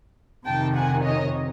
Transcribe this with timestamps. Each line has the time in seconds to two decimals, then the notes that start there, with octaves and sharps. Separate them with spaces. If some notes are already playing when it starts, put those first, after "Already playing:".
0.46 F2 C3 D#3 G5 A5
0.75 F#5 G#5
1.04 C#5 D#5